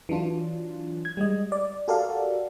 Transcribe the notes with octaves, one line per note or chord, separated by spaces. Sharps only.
E3 F#3 D4 F4
G#6
G3 G#3 D#5
D5
F#4 G4 A4 A#4 D5 F5